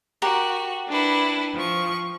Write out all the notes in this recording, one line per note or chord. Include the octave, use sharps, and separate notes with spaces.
F#4 G4 A#4 F#5
D4 E4 B4
F3 C#6